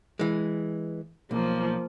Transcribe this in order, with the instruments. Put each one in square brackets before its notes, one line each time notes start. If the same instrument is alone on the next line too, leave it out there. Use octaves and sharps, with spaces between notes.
[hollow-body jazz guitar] E3 G#3
[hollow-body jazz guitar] B1 [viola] F3 A#3